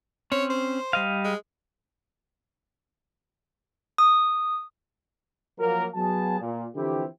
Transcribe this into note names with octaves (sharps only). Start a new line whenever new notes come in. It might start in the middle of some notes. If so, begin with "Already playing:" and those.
C4 C#4 C#5
C5
G3 D#5 F5
G#3
D#6
F3 F#3 A#3 A#4
F#3 B3 G#4 A5
A#2
D3 E3 F3 C4 E4 G4